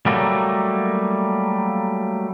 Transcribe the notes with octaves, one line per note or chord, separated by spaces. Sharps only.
F#3 G3 A3 A#3